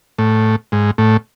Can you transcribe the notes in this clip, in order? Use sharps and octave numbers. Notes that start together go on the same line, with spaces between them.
A2
G#2
A2